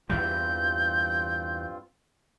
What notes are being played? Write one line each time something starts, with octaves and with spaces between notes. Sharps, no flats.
E2 G2 E3 G3 C4 F4 G6